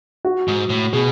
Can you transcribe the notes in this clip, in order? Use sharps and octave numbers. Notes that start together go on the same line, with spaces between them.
F#4
G#2
A2
B2 G#4